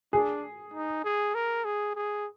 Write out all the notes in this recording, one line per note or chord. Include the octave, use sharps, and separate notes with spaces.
D4 G#4
D#4
G#4
A#4
G#4
G#4